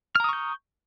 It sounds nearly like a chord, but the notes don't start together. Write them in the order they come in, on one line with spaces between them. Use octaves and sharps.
F6 A#5 D#6 C#6 G6